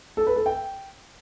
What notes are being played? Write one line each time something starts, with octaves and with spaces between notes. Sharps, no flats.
A4
B4
A4
G5